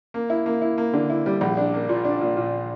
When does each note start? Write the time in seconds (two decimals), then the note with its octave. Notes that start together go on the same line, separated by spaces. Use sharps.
0.14 A#3
0.30 E4
0.46 A#3
0.62 E4
0.78 A#3
0.93 D3
1.10 E4
1.26 G3
1.41 A#1
1.57 D4
1.74 A#3
1.89 A#2
2.05 D4
2.21 A#2
2.37 A#2